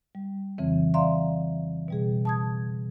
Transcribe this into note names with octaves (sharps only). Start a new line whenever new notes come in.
G3
F2 C#3 E3 C4
D5 E5 F5 A#5 C6
B2 G3 G#4
A5 D#6 G#6